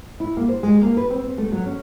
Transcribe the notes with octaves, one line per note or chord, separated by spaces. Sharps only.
E4
A#3
C5
G#3
A#3
B4
C4
C4
A3
F#3
C#4